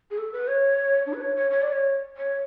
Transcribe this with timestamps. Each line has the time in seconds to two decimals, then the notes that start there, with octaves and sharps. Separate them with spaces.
0.11 G#4
0.18 A4
0.32 B4
0.48 C#5
1.06 D4
1.14 B4
1.21 C#5
1.36 C#5
1.50 C#5
1.62 D5
1.72 C#5
2.17 C#5